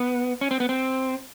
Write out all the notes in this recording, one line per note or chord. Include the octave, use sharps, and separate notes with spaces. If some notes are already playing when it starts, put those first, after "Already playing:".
Already playing: B3
C#4
C4
B3
C4